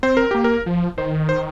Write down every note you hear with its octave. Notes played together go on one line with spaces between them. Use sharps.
C4 C5
A#4
A#3 G4
A#4
F3
D#3 C5
C5